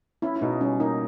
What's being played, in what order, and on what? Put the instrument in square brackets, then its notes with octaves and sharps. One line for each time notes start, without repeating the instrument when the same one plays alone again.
[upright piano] C#4 [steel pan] E4
[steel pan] E4
[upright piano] B2 [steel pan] D#4
[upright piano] G3 [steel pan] C#4
[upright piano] A#3 [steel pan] D#4